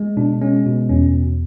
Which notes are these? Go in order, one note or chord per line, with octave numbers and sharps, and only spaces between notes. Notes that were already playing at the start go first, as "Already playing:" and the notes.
Already playing: G#3
B2 D4
G#3 C#4
B2
E2 C#4